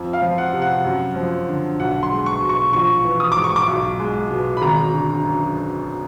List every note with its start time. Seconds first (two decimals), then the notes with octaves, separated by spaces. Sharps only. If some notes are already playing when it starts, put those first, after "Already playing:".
Already playing: F2
0.13 F5
0.22 F3
0.38 F#5
0.53 C3
0.62 F#5
0.85 F#2
1.16 F3
1.48 D3
1.80 B1 F#5
2.03 C6
2.11 G#3
2.26 C#6
2.42 B2
2.49 C#6
2.73 A#1 C#6
3.05 E3
3.20 D#6
3.32 G#2 D6
3.44 C#6
3.56 D6
3.68 B1
4.00 G#3
4.30 B2
4.57 B5
4.62 G#1 A#5
4.93 D3
5.25 F#2